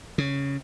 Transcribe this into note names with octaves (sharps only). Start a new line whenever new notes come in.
C#3